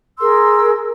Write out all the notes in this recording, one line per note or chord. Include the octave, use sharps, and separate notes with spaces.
G#4 A#4 C6 E6